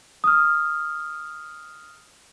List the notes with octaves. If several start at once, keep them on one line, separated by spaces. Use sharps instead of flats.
D#6 F6